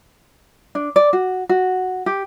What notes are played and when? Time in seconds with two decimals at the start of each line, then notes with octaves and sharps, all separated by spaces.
0.75 D4
0.96 D5
1.13 F#4
1.49 F#4
2.06 G4